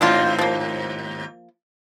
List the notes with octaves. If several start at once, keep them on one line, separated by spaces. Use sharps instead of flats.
D#2 G#2 F#3 C4 D4 F4
F3 A#3